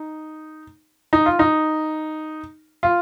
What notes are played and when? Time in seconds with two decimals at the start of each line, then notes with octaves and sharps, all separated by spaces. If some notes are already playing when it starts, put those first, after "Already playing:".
Already playing: D#4
1.13 D#4
1.26 F4
1.39 D#4
2.83 F4